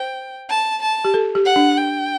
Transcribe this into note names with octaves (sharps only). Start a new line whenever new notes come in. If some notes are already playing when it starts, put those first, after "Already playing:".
Already playing: C5 G5
A5
A5
G4
A4
G4
F#5
D4
G5